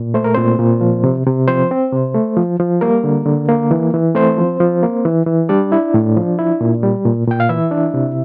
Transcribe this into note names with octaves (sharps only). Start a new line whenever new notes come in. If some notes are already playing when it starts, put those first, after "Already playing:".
Already playing: A#2
A3 C5
A#4
A#2 C4 C5
A#2
F3
C3
C3
F3 C4 C5
C4
C3
A3
F3
F3
G3 A#3 A#4
D3
D3
A#3
E3
E3
A3 C4 C5
F3
F3
A#3
E3
E3
G3 D4 D5
E4
A2
F3
E4
A#2
G3
A#2
A#2 G5
F5
E3 E4 E5
D4
C3